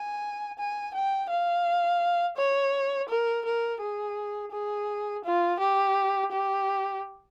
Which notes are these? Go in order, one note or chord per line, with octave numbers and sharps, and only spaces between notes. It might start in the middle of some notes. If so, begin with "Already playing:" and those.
Already playing: G#5
G#5
G5
F5
C#5
A#4
A#4
G#4
G#4
F4
G4
G4